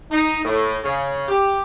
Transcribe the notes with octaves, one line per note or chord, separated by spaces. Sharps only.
D#4
A2
C#3
G4